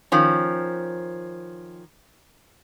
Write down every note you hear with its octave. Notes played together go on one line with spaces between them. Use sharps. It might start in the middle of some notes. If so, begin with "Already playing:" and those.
D#3 F3 C#4